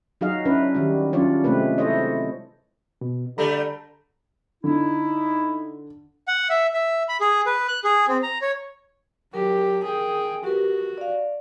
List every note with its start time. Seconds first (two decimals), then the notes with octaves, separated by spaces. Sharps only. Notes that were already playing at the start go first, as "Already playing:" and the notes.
0.21 F#3 D#4 F#4 G#4 D#5 F5
0.45 C#4 D4 E4 B4
0.75 D#3 G3 F#4
1.13 F#3 C#4 D4 F4 C#5 D5
1.44 C3 G#3 A3 C4 B4
1.78 E4 A4 C5 C#5 D#5
3.01 B2
3.38 D3 G3 A3 A4 A#5 B5
4.64 D3 D#4 E4
6.28 F#5
6.50 E5
6.74 E5
7.09 B5
7.21 G#4
7.46 B4
7.68 F#6
7.84 G#4
8.08 C4
8.23 A#5
8.42 C#5
9.34 F#3 G4 A#4
9.84 G#4 G5
10.44 F#4 G4 A#4 B4
10.98 D5 F5